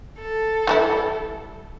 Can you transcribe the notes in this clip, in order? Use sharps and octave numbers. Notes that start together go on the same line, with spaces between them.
A4
E3 G3 E4